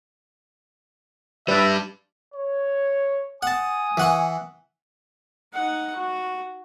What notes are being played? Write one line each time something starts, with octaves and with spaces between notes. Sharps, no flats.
G3 D4 B4 D5 E5
C#5
F#5 G#5 A5 D#6
E3 F#5 C#6
D#4 F#5
F#4